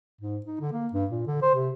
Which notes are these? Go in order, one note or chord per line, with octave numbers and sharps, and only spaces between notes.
G#2
D#4
D3
A#3
G2
A#2
D3
C5
C3